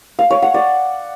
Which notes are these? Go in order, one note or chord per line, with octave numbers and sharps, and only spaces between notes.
F5
C#5
F#5
D5